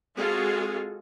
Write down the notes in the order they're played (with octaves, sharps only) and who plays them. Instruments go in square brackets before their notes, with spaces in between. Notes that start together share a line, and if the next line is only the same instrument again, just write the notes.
[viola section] G#3 C4 F4 F#4 G#4 A4